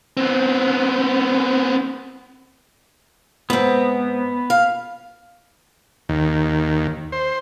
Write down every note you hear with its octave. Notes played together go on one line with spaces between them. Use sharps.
B3 C4
G#2 B3 C4
F5
D#2
C5